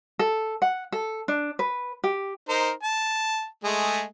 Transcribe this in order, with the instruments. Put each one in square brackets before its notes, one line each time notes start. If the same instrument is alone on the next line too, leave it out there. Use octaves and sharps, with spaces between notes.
[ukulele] A4
F#5
A4
D4
B4
G4
[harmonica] D#4 A#4 C5
A5
G#3 A3 G#4